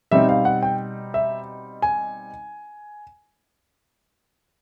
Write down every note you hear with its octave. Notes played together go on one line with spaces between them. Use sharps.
B2 G3 C4 D#4 E5
F5
F#5
G5
E5
G#5